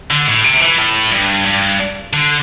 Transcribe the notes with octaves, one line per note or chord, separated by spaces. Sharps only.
D3
A2
C3
E3
A2
G2
G2
D3